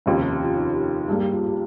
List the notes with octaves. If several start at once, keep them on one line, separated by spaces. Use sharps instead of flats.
F1 D#2 C#3 F4
G4
G4
F4
D#4
G2 G3 A#3 G#4
G4
F4
G4